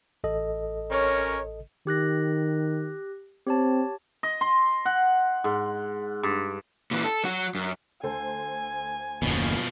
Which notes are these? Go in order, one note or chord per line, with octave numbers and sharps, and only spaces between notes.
A1 A4 D#5
C#4 A#4 C#5
D#3 G4 F#6 A#6
C4 G4 C#5 A5
D#5
C6
F#5
G#2
G2
A#2 E3
A4
F#3 F#4
F#2
D2 A4 C5 G#5
F#1 D#2 B2 F3